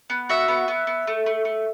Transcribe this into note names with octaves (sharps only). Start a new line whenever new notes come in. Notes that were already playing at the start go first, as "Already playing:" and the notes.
B3
F#4 E5
B3
B3
B3
A3
A3
A3